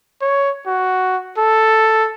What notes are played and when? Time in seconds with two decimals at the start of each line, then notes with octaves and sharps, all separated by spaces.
0.21 C#5
0.67 F#4
1.38 A4